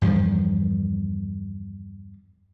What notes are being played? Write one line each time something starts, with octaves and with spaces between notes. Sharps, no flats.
E2 G2 D#3 F3